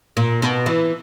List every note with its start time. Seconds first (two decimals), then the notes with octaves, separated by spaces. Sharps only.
0.17 A#2
0.42 B2
0.66 E3